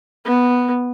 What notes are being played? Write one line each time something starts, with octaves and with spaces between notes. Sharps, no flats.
B3